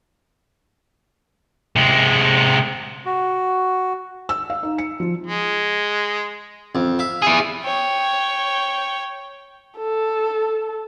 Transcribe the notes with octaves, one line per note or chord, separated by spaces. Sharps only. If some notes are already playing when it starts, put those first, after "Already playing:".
C3 G#3
F#4
E6
F5
D#4
C#7
F3
G#3
F2
E5 F5
E4 G#4
C#5 G5
A4